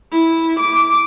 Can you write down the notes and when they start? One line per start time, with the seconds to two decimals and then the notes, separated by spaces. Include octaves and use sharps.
0.13 E4
0.60 D6